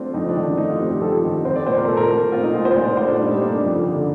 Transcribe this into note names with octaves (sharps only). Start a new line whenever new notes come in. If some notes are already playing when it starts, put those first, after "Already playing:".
Already playing: A3 C4 D4 F4
F2 D#4
D4
D#3
D4
A3 D#4
F4
C4 G4
G4
F2 A4
D#3
C4 C5
D5
A#2 C5
A#4
A#2 A4
A#4
A3
C4 F4
D#4
A#2 F4
C5
A#2 D5
C5
A3 C5
D4
G3 D#4
A#3 D4
F2
D3